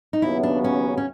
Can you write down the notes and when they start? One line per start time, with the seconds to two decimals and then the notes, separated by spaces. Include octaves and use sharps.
0.13 D#4
0.22 D#2 C#3 F#3 B3 E4
0.43 D4
0.64 C#4
0.97 C#4